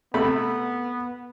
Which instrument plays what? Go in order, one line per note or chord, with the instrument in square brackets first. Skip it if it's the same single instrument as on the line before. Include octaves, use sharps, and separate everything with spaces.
[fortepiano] C3 A3 B5 [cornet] B3